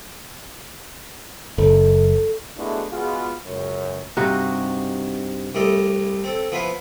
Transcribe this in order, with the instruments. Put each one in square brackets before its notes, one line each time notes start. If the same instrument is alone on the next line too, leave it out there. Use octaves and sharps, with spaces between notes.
[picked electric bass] F#1 [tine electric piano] A4
[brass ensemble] G#3 A3 B3 D4 E4 F#4
G#3 B3 F4 F#4 G#4 F5
C#2 F#2
[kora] G2 C3 D#4 F#4
[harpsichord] C2 G3 A3 A4 D#5
C4 A4
F3 B3 E4 F4 B4 C5